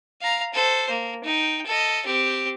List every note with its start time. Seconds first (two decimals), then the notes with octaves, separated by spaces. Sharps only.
0.22 F5 A#5
0.54 A4 C5
0.89 A#3
1.24 D#4 G5
1.66 A4 D#5
2.05 C4 G4